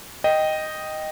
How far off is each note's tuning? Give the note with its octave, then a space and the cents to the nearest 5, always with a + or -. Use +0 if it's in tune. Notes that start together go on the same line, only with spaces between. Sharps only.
D#5 +0 G5 -5